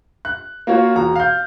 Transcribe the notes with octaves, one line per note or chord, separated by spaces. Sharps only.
F#6
A#3 F4 F#4 C#5
E1 F#4 A#5
F5 G6